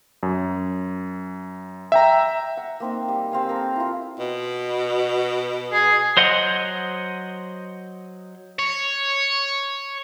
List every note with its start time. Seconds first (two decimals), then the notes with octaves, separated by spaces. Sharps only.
0.23 F#2
1.92 E5 G5 A#5
2.57 F#5
2.80 A#3 C4 D#4
3.09 G3
3.32 G3 C4 F5 G#5
3.49 A4 A#4
3.76 E4 F4
4.19 B2
5.72 G#4
6.17 F#3 C5 D#5 F#5 C6
8.59 C#5